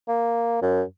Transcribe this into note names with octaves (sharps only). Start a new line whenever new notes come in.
A#3
F#2